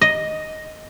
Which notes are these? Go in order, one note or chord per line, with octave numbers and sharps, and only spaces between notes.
D#5